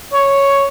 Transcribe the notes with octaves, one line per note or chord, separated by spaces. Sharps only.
C#5